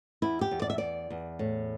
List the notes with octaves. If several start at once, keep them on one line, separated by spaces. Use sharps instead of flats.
E2 E4
G4
E2
D5
E5
E2 D5
E2
A2